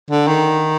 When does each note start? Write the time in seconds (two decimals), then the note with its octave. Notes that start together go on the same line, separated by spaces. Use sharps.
0.11 D3
0.27 D#3